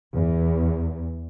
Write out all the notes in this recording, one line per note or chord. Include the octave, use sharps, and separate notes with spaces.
E2